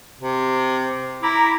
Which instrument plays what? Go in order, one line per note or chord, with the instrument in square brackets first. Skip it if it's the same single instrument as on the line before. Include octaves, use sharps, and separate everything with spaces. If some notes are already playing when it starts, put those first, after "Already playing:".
[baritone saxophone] C3
[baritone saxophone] E4 [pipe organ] A#5 B5 D6